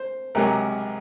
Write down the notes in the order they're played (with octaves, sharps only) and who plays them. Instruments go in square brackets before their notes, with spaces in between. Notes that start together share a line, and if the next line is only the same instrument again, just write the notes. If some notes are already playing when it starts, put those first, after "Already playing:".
Already playing: [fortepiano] C5
C#2 C3 F#3 A#4